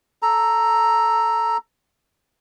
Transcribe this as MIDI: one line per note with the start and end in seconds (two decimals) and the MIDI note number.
0.22 1.57 69
0.22 1.57 82